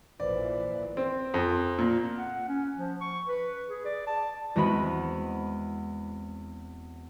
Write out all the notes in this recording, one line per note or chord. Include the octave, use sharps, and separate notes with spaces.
A#1 A#2 E3 B4 C5 D5
C4
F2
A#2
F#5
C#4
F3
C#6
B4
G#4
D5
A5
E2 G#3 C4 F#4 B5 D#7